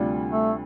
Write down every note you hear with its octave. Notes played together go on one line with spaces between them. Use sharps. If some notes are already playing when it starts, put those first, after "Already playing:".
Already playing: D2 C3 G3 D4 F4
A3